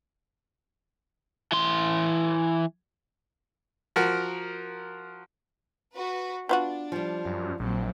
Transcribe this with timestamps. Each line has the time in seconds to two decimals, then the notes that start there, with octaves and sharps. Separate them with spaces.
1.52 E3 C6
3.96 F3 F#4 A#4
5.95 F#4 B4
6.49 B3 D4 F4 F#4
6.92 F3 G3
7.25 F#2
7.60 A#1 F#3 C4